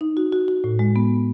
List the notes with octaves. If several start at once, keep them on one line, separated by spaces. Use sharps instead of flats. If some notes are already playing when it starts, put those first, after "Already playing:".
D#4
F#4
F#4
F#4
A2
G#3
B3